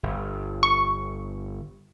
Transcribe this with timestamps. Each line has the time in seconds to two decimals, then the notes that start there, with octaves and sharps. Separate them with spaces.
0.03 G1
0.63 C#6